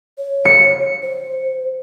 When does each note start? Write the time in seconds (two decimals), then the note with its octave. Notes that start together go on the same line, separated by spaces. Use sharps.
0.18 C#5
0.45 C#7
1.02 C5